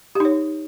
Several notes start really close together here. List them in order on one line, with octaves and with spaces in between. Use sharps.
G4 D#4 C#5